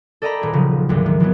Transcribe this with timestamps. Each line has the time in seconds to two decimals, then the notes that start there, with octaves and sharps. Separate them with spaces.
0.22 A4 D5 D#5 G5 A#5 B5
0.41 D#1 G#4
0.53 C#3 F3 F#3
0.89 G#1 D2
1.06 D#3
1.20 E3 F#3 G#3 B3